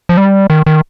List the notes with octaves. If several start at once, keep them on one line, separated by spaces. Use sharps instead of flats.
F3
G3
D#3
D#3